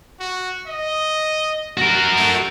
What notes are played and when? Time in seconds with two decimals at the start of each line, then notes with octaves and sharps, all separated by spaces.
0.20 F#4
0.67 D#5
1.78 F#4 A#4
2.16 A3